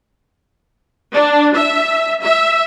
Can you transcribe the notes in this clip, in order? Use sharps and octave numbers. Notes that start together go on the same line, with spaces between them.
D4
E5
E5